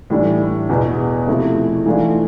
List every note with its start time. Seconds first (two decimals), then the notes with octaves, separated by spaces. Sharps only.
0.10 A2 E3 G3 D4
0.69 E2 B2 B3
1.27 C3 F3 A3 E4
1.86 E3 A3 D4 F4